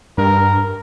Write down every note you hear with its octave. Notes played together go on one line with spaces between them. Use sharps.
G2 A#4